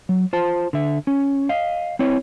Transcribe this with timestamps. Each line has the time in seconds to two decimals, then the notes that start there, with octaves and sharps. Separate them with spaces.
0.09 F#3
0.33 F4 C5 A5
0.73 D3 E5
1.07 C#4
1.49 D#5 F5
1.99 C4 E4 C#5